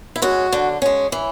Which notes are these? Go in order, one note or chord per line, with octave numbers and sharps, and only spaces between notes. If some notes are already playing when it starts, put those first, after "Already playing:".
E4
G#3 C#4 F#4
D3
G#3 C#4
E3